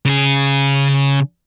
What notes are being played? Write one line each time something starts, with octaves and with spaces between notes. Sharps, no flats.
C#3 G#4